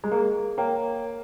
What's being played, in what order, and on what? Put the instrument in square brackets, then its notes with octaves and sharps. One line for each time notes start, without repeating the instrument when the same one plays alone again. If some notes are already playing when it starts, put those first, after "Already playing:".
[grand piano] G#3
[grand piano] A#3 [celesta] G#4
[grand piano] A#3 [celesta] C#5 G5